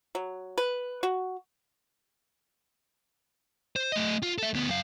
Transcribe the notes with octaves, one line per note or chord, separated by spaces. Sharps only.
F#3
B4
F#4
C5
A3 D#5
F4
A4 E5
D2 B3
F#2 F5